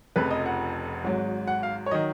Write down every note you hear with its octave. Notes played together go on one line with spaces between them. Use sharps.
F1 F2 C#3 B4
D#5
F#5
G#1 G#2 F#3
F#5
F5
C#5
D#3 F#3 D#5